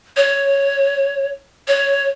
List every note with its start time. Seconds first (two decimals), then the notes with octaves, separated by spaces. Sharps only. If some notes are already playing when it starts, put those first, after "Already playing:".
0.17 C#5
1.68 C#5